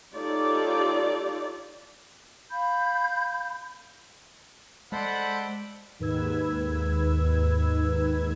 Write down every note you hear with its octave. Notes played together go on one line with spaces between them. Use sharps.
D#4 F4 G4 A4 C#5 D5
F5 B5 G6
G#3 A4 C5 D5 F#5 B5
D#2 G#2 D#3 B4 E6 G#6